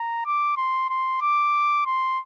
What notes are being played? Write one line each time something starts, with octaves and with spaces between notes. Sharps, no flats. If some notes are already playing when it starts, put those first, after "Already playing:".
Already playing: A#5
D6
C6
C6
D6
C6